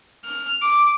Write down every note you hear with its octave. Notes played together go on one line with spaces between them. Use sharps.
F6
D6